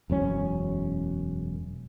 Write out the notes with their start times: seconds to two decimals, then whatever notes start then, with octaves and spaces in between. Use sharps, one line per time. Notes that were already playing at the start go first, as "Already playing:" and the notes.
0.10 E1 F#2 C#4